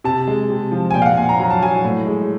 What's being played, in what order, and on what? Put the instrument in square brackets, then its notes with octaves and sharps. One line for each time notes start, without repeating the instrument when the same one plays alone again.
[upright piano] C3 A5
G#3
C3
F3
G#5
A#2 G5
F5
F#5
A#2 G#5
A#5
F#3 A#5
A5
F#3 G#5
A2
G#3